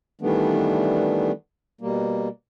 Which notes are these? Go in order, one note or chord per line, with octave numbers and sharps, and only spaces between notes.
D#3 E3 G3 A3 B3 D4
B2 G3 A#3